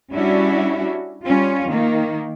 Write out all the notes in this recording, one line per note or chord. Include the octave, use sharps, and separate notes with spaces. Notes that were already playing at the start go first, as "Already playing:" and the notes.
G3 C#4 D4 E4 F#4
G3 C#4 F4
D#3 A#3